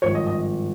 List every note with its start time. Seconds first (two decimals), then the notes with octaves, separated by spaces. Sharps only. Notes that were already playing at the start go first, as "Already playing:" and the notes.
0.02 G#1 G2 F3 C#5
0.15 D#5
0.26 D#5